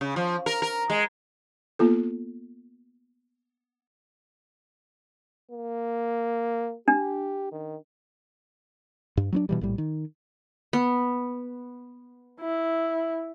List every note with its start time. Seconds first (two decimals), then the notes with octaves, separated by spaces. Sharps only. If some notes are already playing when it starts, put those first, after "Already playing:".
0.01 C#3
0.16 F3
0.46 A#4
0.62 A#4
0.90 G#3
1.79 A#3 B3 F4 A4
5.51 A#3
6.88 D4 G4
7.52 D#3
9.17 G2
9.32 F#3 B3 D4
9.49 B2 E3 G3
9.61 A#1 A2 G3
9.78 D#3
10.73 B3
12.40 E4